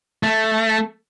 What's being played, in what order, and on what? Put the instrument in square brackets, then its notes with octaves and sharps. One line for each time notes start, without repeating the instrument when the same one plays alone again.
[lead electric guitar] A3